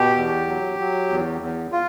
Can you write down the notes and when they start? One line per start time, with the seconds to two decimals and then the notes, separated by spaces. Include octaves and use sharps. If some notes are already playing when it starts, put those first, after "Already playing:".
Already playing: B2 G4
0.16 E2
0.48 F#3
0.79 F#3
1.10 E2
1.41 E2
1.72 F4